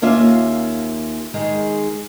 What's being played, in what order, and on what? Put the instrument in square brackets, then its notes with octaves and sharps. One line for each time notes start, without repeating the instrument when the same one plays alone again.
[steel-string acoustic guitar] D#2 A#3 C#4 F4 E5
D#3 G#3 G#4